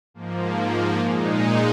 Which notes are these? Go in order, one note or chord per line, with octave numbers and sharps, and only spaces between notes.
G#2 F3 A#3
A#2 G#3 D#4